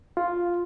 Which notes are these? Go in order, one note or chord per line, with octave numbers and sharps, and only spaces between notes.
F4